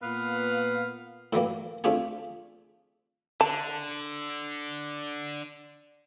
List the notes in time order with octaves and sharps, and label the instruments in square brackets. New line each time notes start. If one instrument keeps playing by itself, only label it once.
[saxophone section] A#2 B3 B4 F5
[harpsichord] A2 E3 F#3 G3 A#3
A3 C4 D4 F4 G4 G#4
[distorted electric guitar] D3 [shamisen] A5